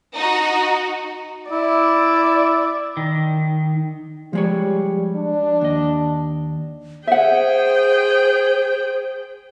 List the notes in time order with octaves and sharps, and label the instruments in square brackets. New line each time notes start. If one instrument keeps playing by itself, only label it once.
[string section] D#4 F#4
[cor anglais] E4 [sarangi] D5
[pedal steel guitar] D#3
[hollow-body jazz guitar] F3 G#3 C#5 [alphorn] G3
[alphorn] D4
[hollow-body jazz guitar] D#2 D#5
[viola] G#4 G5 [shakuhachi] C5 [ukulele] E5 F#5